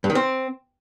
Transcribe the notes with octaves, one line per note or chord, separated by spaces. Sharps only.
G2
D#3
C4